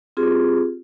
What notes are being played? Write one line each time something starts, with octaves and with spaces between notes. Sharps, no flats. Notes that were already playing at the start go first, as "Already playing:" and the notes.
C4 F4 G4 G#4